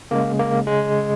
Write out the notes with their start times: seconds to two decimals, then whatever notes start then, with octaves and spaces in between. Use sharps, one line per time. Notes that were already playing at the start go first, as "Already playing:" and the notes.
0.11 C#3 G#3 A#3
0.39 A#3
0.67 G#3